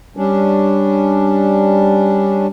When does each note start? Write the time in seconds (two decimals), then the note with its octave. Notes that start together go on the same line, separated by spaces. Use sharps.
0.17 G3 C#4 D4